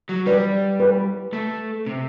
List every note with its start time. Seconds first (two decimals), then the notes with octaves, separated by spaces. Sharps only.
0.09 F#3
0.26 G3 B4 D5
0.80 B4
1.33 A3
1.87 C3